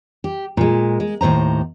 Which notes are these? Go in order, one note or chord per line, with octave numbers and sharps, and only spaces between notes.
G4
A#2 G#3
G#3
D#2 A2 C5 A#5